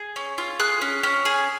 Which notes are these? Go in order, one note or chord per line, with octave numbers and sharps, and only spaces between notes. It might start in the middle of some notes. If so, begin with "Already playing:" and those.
Already playing: G#4
C#4
F4
G#4 F#6
C#4
C#4
G#4